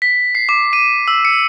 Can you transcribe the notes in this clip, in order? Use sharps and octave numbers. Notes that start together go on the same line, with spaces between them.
B6
C7
D6
D#7
E6
C#7